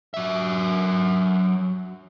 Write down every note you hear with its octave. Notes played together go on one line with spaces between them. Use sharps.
F#3 E5